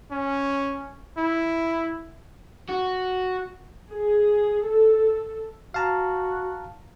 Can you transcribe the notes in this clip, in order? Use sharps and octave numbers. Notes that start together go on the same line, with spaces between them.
C#4
E4
F#4
G#4
A4
F#4 F5 A5 A#5